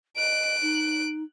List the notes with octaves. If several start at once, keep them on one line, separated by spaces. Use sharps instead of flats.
D#5 F#6 D7
D#4